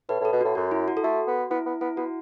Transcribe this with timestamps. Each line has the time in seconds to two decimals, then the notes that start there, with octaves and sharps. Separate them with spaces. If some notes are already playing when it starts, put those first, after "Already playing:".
0.08 A2 B4
0.21 A2
0.25 A4
0.32 B2
0.41 A2 F#4
0.55 F#2 F#4
0.71 E4
0.88 F#4
0.97 A4
1.03 A3 F#4
1.27 B3
1.50 B3 E4
1.66 B3
1.81 B3 E4
1.96 B3 F#4